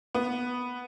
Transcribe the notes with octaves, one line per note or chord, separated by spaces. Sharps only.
B3